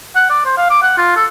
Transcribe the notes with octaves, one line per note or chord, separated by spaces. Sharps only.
F#5
D5
C5
F5
D6
F#5
F4
A4